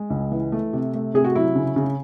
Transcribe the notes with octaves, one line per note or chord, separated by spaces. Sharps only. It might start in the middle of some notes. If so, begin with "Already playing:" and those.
Already playing: G#3
C#2
E3
A3
C3
A3
C3 G#4
F#4
F#3 E4
C#3
C#3